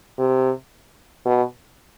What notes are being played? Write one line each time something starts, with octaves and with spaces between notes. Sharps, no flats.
C3
B2